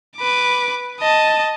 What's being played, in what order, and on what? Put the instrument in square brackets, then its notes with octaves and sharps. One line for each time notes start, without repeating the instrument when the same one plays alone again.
[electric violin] B4 D6
D#5 A5